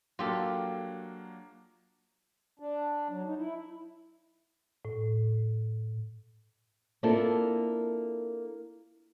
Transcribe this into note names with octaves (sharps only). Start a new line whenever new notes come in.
F#3 A#3 D4 F4 G4 A4
D4
F#3
D#4
E4
A2
A#3 C4 D4 E4 F4 A4